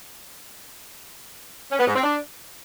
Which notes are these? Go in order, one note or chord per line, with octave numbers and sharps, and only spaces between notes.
C#4
B3
G#2
C4
D4